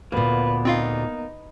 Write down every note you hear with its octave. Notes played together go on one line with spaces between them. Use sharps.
D2 A#2 A#3 B3 B4
C4 D#4 F4 F5